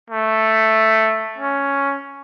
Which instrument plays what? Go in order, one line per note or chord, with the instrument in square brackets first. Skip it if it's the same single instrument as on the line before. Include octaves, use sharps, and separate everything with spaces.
[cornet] A3
C#4